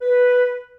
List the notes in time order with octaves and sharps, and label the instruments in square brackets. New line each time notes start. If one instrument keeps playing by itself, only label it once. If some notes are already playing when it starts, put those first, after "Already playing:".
[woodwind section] B4